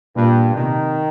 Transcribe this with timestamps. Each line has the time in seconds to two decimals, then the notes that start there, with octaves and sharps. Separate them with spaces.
0.16 G2 A#2
0.55 C3 D#3